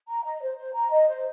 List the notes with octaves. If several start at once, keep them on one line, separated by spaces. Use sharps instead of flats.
A#5
D#5
C5
C5
A#5
D#5
C5